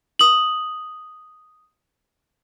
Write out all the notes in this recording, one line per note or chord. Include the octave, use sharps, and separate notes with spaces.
D#6 F#7